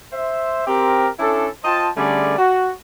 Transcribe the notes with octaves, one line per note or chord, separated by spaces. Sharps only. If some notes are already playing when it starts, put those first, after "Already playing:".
C5 E5
C4 G4 A#4
C#4 D4 E4 A4
F4 C5 D#5 G5 A5
D3 G3 A3 C#4 G#4 D5
F#4